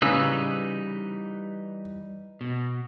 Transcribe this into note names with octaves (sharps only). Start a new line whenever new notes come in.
C#3 E3 G3 D#4 B4 E6
B2